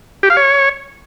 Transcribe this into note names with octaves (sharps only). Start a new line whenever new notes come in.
G4
F5
C#5